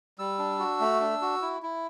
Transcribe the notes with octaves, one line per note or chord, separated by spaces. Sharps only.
G3 E6
D4
F#4
A3
D4
F#4
E4
E4